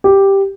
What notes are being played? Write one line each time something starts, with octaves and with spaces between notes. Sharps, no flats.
G4